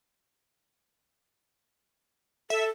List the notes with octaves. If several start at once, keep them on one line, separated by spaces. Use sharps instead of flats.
A4 E5